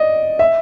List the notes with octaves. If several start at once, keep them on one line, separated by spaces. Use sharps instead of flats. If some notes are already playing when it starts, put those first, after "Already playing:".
Already playing: D5 D#5
E5